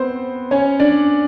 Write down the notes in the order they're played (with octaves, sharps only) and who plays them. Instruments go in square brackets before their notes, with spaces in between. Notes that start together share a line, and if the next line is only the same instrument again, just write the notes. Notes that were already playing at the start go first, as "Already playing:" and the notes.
Already playing: [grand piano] B3 C4 B4 C5
C#4 C#5
D4 D5